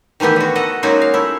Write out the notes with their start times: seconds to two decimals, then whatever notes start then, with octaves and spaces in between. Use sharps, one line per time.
0.20 D#3 E3 A3 B3 G4
0.36 D3 F#4
0.55 A4 D#5 F#5 A#5
0.83 F#3 G#3 A#3 C#4 D#4 F#4
1.02 F5
1.14 A3 E4